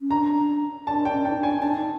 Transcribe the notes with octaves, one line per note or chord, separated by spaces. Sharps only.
C#4
D4 A#5
D4 A5
G5
C#4
G5
D#4
D4
G#5
D4 A5
D#4